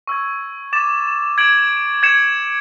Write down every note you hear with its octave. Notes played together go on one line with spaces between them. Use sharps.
C#6 E6 G#6
D6 A6 E7
G#6 D7 F#7
G#6 C#7 E7